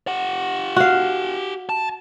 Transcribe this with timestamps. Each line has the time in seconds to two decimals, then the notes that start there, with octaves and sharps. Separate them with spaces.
0.08 G4 F#5
0.76 F#4 F5
1.69 A5